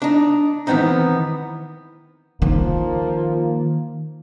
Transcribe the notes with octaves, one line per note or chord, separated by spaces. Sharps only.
D4 D#4
D#3 E3 B3 C4 D#4
D#3 F3 A#3